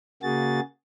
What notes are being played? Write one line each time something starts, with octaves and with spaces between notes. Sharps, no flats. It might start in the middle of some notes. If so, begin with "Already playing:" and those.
C#3 A#3 F#4 G#4 A6